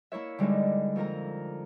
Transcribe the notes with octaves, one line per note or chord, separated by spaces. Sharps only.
A#3 E4 C#5 E5
D3 G3 G#3 D#4 E4
F2 A#3 A#4 A#5